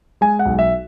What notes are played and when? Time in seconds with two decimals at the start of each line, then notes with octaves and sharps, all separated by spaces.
0.21 G#3 G#5
0.39 F#5
0.45 B1
0.59 E5